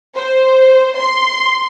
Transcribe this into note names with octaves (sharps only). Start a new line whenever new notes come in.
C5
C6